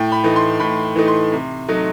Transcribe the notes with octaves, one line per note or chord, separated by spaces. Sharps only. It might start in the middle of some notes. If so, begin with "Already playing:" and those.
Already playing: A2 G5
B5
E3 A3 D#4
C6
A2 B5
E3 A3 D#4
C6
C3
F#3 A3 D#4